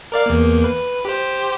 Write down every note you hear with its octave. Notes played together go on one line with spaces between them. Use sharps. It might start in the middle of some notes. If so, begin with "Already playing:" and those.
A#4 D5 F5
E2 A#3
B4
G4 C5